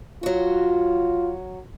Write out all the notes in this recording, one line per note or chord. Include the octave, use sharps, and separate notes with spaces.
F#3 F4 F#4